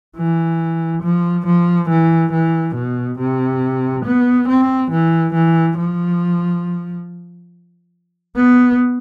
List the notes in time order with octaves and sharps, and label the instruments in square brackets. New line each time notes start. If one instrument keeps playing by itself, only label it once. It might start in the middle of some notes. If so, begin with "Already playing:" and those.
[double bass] E3
F3
F3
E3
E3
B2
C3
B3
C4
E3
E3
F3
B3